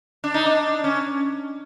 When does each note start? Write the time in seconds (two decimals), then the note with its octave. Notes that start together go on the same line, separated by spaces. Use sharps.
0.24 D4
0.34 D#4
0.46 D4
0.84 C#4